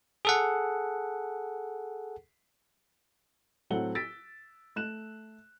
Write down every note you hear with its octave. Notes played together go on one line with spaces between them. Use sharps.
G#4 A4 F#5
A2 F#3 C4 A4 F#5 G7
E6 A6 B6 D7
A3 F#6 E7